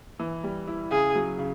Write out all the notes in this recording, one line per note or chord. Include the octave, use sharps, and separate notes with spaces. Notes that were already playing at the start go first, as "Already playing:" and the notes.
E3
G3
E4
C#3 G#4
F#3
C#3